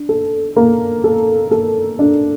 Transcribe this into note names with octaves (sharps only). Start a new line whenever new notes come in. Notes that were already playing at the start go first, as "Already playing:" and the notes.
Already playing: D4
A4
A#3
A4
A4
D4